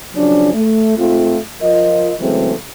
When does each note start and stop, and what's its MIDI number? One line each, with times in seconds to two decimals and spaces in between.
0.15 0.53 49
0.15 0.53 53
0.15 0.53 54
0.15 0.53 61
0.15 0.53 62
0.54 0.92 57
0.97 1.37 44
0.97 1.37 57
0.97 1.37 60
0.97 1.37 65
1.62 2.11 53
1.62 2.11 65
1.62 2.11 70
1.62 2.11 75
2.19 2.52 49
2.19 2.52 52
2.19 2.52 54
2.19 2.52 56
2.19 2.52 57
2.19 2.52 60